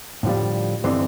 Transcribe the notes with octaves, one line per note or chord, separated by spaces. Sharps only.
A2 D3 F3 G3
G2 D3 E3 C4 D#4 C6